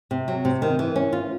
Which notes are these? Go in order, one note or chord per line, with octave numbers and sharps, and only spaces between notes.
C3
F#3
C3
D#3
E3
C#4
F4